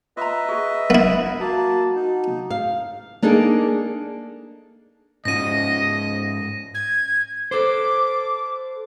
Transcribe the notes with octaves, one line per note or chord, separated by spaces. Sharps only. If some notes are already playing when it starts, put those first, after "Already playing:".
F4 B4 D#5 E5 A#5
F#4 G#4
B3 E4 A#4 F5
A#3 F#4 A5 A#5
D#4
F5
A#3 D4 D#4 G#4 A4
G#2 C#4 F4 D#5 A#6 D#7
G#6
A4 C5 D6